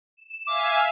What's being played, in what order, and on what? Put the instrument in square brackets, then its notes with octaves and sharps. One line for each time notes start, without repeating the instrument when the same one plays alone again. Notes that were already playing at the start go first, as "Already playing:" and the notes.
[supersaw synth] E7
[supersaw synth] E5 F5 G#5 [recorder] D6